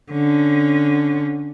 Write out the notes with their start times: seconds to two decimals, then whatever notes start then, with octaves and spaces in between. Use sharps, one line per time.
0.12 D3 C#4